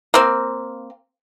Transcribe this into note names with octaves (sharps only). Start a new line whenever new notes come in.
A#3 C4